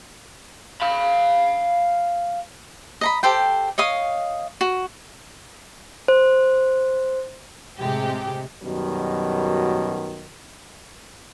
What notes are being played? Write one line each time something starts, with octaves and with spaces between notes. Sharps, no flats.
F5 B5
D#5 A#5 B5
G4 A4 C5 G5
C#5 D#5 F5 D#6
F#4
C5
A2 C3 G#3 G4
F#2 B2 D#3 F#3 G3